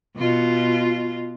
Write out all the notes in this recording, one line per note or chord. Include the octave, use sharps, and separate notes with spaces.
B2 F4